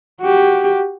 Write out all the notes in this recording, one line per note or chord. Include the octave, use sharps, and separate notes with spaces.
F#4 G4